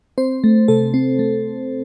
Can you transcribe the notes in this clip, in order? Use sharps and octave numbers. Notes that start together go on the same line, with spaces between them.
C4 C5
A3
C3 A4
C4
A3